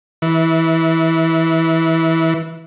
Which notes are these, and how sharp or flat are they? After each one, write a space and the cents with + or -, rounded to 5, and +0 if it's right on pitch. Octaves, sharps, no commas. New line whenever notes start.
E3 -20